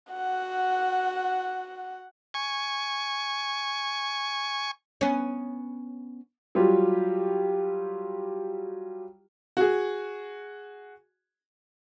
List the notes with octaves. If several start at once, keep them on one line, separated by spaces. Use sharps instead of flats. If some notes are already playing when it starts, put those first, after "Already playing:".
F#4 F#5
G#5 C#6
B3 C#4
F#3 G3 F4 G4
F#4 G#4